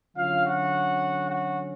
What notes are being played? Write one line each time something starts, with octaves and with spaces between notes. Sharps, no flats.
D3 F#3 C#4 F4 F5
F#4 F#5
F#4 F#5